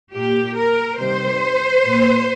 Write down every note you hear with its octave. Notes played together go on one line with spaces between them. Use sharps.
A#2 A#3 G4
A#4
C3 D#3 G3 C5
A#2 A#3